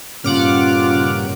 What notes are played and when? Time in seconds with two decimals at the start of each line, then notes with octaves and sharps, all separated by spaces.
0.24 G2 A#2 C#3 C#4 F4 F#5 D6 F6